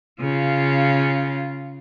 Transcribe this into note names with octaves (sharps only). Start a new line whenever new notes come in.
C#3 F4